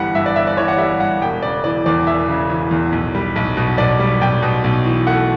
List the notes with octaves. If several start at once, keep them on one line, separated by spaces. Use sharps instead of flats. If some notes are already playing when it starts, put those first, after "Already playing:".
Already playing: G1 E3 G3 F#5
G2 E5
D5
G1 E5
D5
E3 C#5
F#5
G3 E5
G2 F#5
E1 G5
C#3 D5
E3 D5
E2 D5
E1 E5
C#3
E3
E2
B1
G3
B1
B2
B1 D5
G3
B1 G5
B2
B1
E3
A3 F#5